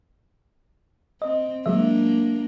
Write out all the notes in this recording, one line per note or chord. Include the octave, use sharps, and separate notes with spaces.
C4 D#5
F#3 G#3 A#3 D4 E5